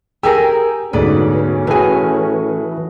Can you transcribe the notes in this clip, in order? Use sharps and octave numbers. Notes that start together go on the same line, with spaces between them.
G4 G#4 A#4 G5 G#5 E6
D2 G#2 B2 C#4 B4 D5
A2 E3 F#4 G#4 B4 G#5